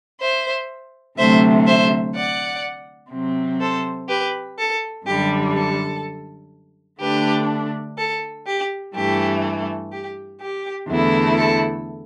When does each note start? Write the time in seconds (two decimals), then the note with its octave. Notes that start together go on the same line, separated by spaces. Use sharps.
0.21 C5 E5
1.18 D2 C3 F#3 A3 C5 E5
1.67 C5 E5
2.15 D5 F#5
3.12 C3 F#3 C4
3.60 A4 C5
4.09 G4 B4
4.58 A4
5.06 F#2 D3 G3 G4
5.54 A4
7.01 D3 A3 D4 G4 B4
7.97 A4
8.46 G4
8.95 G2 E3 A3 G4
9.92 G4
10.41 G4
10.88 E2 D3 A3 E4
11.37 A4